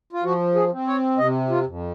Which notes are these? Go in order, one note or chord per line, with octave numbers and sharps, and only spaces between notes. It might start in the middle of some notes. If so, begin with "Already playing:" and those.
F4
F3 F#4
G#4
C4
C#5
C3 D#5
F4
F2